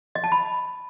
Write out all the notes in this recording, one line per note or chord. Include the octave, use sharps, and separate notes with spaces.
D#5
A5
B5